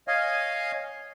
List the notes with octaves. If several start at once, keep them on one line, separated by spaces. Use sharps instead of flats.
C#5 D#5 F5 G#5